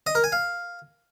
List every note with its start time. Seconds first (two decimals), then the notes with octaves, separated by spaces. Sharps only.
0.07 D#5
0.15 A#4
0.24 G#5
0.32 F5